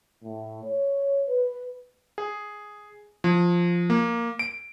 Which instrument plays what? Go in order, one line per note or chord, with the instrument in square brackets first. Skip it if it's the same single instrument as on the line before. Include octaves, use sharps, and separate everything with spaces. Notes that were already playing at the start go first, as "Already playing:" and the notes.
[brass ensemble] A2
C#5
B4
[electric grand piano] G#4
F3
A#3
D7